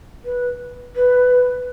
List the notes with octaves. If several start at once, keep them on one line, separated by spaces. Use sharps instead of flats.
B4
B4